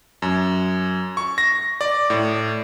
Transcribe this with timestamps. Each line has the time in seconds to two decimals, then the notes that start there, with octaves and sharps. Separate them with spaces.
0.22 F#2
1.17 C#6
1.38 A#6
1.81 D5
2.10 A2